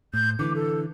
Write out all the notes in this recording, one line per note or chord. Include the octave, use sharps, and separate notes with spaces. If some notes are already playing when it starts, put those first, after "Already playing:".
A2 G6
D3 E3 D6
A4